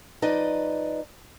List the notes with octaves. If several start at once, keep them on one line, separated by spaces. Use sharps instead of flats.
F3 D#4 B4 D5 D#5